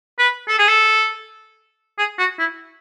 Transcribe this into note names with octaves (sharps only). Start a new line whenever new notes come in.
B4
A4
G#4
A4
G#4
F#4
E4